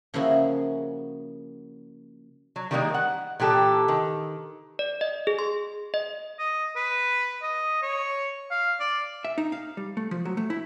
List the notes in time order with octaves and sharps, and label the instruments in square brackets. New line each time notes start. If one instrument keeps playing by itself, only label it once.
[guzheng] C#3 F3 A#3 E4 F#4 G#4
[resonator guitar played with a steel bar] F#3
D#3 E3 G3 G#3 A#3 D#4
F#5
A#2 E3 G4 A4
D#3
[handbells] D5
D#5
G#4
C6
D#5
[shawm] D#5
B4
D#5
C#5
F5
D5
[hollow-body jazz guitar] E5
D#4
F5
G3
A3
F3
F#3
A3
E4